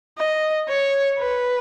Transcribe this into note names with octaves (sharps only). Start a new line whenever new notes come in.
D#5
C#5
B4